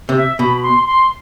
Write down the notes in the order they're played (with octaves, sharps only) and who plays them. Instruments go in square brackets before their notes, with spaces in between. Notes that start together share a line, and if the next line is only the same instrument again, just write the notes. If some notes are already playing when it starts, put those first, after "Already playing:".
[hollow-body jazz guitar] C3
[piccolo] E5
[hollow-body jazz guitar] B2 [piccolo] B5
[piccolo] B5
C6
C6